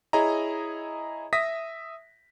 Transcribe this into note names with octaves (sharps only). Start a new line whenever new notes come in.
E4 G#4 C#5 D#5 A#5
E5 D#6 A#6 B6